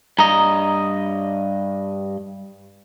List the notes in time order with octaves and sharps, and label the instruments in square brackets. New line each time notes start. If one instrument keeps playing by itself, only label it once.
[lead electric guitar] G2 D#5 [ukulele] A#5